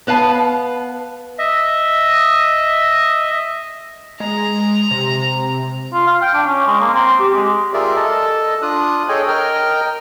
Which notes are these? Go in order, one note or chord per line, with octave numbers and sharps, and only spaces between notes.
B3 B4 F5 A5
D#5 E5
G#3 A#5
C3
F4
F5
G5
D4
C#4
G#3
A#3
C4
G4
G#3
F4 G4 G#4 A#4 D5 E5
A4 D#5 A5
D4 F4 D#6 F#6
G#4 A4 C#5 D#5 G5 G#5
A#4 D#5 G5 F6